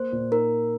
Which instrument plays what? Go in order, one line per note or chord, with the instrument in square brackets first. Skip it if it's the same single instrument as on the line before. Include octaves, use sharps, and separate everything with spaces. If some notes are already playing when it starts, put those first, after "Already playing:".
Already playing: [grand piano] A#3 [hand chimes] C5
[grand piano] A#2
[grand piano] D#4 [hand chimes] A#4